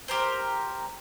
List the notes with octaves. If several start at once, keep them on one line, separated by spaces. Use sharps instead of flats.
G4 A#4 C5